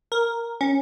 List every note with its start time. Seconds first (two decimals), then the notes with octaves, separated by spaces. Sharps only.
0.12 A#4
0.61 C#4